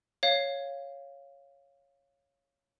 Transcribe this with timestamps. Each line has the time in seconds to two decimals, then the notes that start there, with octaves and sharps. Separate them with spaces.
0.23 C#5 F5